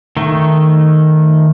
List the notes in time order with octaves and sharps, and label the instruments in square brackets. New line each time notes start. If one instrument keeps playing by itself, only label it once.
[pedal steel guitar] D#3 A3